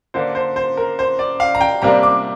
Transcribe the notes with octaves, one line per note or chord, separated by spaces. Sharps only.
D3 A#3 D4 C5
C5
C5
A#4
C5
D5
F5
A#5
G5
C3 G3 A#3 D4 A#5
D6